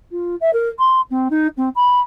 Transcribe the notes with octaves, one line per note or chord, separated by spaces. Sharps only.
F4
E5
A#4
C6
C4
D#4
C4
B5